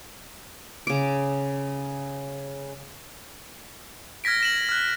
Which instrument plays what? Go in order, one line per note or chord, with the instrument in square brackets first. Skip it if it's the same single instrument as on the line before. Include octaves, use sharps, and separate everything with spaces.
[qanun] C#3 D6
[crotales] F6 G#6 A#6 B6 D7
A#6 E7 F#7
F6 F#6